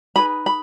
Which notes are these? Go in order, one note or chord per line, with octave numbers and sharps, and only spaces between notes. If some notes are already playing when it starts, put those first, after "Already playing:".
D#4 G#4 B4 B5
B5